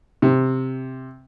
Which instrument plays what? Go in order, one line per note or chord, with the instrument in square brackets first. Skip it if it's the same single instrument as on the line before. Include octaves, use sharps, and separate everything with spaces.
[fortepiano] C3